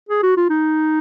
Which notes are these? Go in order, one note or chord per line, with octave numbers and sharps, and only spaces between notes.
G#4
F#4
F4
D#4